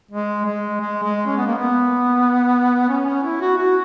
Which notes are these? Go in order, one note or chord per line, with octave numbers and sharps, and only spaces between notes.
G#3
G#3
G#3
G#3
C#4
B3
A#3
B3
C#4
C#4
E4
F#4
F#4